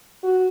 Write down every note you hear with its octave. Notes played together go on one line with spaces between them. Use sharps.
F#4